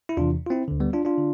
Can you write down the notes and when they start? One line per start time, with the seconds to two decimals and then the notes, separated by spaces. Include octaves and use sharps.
0.09 E4
0.17 E2 C3 E3 D4 F4
0.47 F4
0.50 C4 E4
0.68 D2 D3
0.80 G3 B3
0.93 D4 F4
1.05 D4 F4
1.18 D3